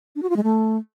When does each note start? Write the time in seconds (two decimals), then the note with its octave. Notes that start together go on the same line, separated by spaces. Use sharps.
0.16 D4
0.23 F#4
0.30 F4
0.37 G#3
0.43 A3